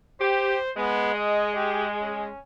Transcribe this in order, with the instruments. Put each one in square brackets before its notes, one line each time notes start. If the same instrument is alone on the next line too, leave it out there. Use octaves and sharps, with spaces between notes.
[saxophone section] G4 [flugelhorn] C5
[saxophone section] G#3 [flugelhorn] B3
[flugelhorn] D#5
G4
C#4